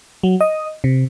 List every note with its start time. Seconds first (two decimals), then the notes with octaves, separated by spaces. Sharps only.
0.23 F#3
0.41 D#5
0.84 C3